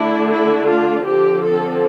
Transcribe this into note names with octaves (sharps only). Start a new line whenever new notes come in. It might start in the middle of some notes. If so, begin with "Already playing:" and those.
Already playing: D3 A3 D4 E4
E4
F4
D3 F3 C4 G4
A4